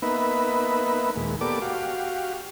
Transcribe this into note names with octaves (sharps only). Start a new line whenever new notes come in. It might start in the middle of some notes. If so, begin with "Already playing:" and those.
A#3 B3 D#4 B4 E5
D#2 A#2 G#3
A#3 B3 G4 A4 D5 D6
F#4 G4 F5